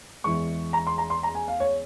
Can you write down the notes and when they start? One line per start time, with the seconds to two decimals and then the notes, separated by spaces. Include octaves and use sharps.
0.24 E2 E3 G#3 C#6
0.73 A#5
0.87 C6
0.98 A#5
1.10 C6
1.23 A#5
1.35 G#5
1.48 F5
1.60 C#5